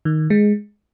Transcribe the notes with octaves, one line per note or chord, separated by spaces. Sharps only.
D#3
G#3